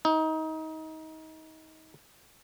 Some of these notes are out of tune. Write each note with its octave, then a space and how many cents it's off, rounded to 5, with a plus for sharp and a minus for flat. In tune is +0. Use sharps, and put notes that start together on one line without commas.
D#4 +25